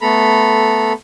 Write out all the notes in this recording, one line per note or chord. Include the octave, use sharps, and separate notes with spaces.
A3 B3 A4 A#5 B5